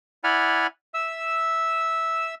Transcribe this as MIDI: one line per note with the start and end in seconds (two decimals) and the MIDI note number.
0.24 0.67 64
0.24 0.67 74
0.24 0.67 78
0.24 0.67 80
0.24 0.67 83
0.24 0.67 89
0.94 2.34 76
0.94 2.34 88